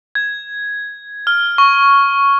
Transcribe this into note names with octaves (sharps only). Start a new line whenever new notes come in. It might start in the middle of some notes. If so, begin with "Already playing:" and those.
G#6
F6
C#6